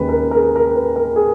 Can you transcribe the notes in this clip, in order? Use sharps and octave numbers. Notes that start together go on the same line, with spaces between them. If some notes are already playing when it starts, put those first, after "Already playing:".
Already playing: D#2 C#3 G#3 B4
A#4
A#4
G#4
A#4
B4
A#4
G#4